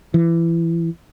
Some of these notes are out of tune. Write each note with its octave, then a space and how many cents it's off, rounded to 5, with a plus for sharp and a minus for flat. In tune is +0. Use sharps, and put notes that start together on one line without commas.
E3 +20